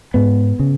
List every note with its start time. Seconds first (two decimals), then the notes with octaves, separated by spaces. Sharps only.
0.14 G#2 B3
0.59 C#3